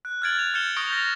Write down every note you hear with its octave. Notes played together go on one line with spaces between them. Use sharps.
F#6
F6 F#6 G#6 A6 D7 F#7
F7
F6 G6 A6 C#7 E7 G7
C#6 D#6 G6 A#6 D7 G7
G6 A6 A#6